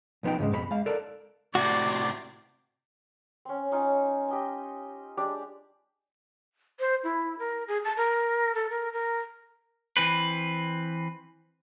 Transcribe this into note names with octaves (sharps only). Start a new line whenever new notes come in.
B1 F3 B3 D#4 G5
D2 G#2 C#3 G#3
F2 B2 A#4 B5
G#3 F5
A4 A#4 D5
A2 C3 F#4 D5
C4 C#4
C#4 D#4 F4
G4 D#5 G5 G#5
G#3 D4 G4 D5
C5
E4
A#4
G#4
A5
A#4
A4
A#4
A#4
E3 C4 B4